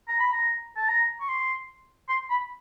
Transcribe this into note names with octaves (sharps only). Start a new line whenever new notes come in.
A#5
B5
A#5
A5
A#5
C#6
C6
C6
B5